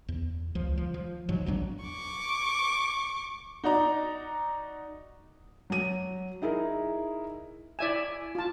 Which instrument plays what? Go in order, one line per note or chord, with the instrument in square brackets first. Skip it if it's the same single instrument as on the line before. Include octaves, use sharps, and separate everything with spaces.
[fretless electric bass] E2
C#2 F3
F3
F3
G#2 F3 F#3
A1 E2 F#3 D4
[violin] C#6 D6
[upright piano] D#4 F#4 D5 A#5
[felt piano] F#3 D#7
D#4 E4 G#4 A#4
[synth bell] E4 E7 [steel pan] D5 E5 G#5
[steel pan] F4 A5